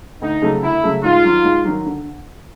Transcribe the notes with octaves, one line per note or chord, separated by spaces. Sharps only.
D2 D#4
C#3 F#3 A3
D2 E4
C#3 F#3 A3
G#2 F4
D#3 F#3
G#2
D#3 F#3
D3